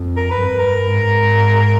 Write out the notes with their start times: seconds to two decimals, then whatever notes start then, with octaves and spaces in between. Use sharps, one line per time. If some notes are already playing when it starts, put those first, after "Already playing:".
Already playing: F2
0.17 A#4
0.31 G2 B4
0.59 A#4
0.88 G#2